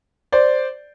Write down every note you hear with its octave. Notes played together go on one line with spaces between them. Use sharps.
C5 D5